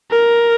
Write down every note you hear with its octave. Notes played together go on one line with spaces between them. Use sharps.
A#4